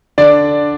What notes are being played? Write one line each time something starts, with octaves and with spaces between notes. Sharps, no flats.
D3 D4 D5